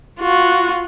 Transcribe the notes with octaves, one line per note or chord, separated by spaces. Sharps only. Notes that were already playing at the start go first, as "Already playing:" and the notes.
F4 F#4